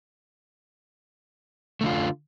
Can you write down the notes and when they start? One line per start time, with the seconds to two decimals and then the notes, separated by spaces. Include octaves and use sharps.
1.81 A3
1.83 D3
1.86 F4